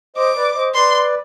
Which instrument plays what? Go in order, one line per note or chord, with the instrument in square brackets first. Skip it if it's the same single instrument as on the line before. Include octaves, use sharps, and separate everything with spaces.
[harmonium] C5 D#5 [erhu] D6
[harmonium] B4 D5
C5 D#5
[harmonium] B4 D5 [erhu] C6